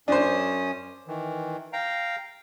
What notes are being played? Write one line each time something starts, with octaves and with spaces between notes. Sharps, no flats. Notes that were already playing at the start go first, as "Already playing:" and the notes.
F#2 C#4 D4 C5 D#6
D#3 E3
F5 G5 A#5